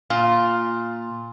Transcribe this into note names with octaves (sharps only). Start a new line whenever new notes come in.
A#2 F4